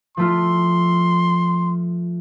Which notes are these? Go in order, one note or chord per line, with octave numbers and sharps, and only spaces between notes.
F3 A3 F4 C6